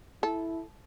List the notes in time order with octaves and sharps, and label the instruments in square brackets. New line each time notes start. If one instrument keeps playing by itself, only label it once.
[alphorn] E4 [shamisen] A4